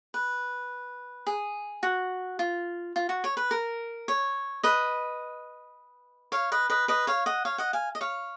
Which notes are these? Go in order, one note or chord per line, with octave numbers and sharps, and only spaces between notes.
B4
G#4
F#4
F4
F4
F#4
C#5
B4
A#4
C#5
B4 D#5
C#5 F5
B4 D#5
B4 D#5
B4 D#5
C#5 F5
D#5 F#5
C#5 F5
D#5 F#5
F5 G#5
D#5
C#5 F5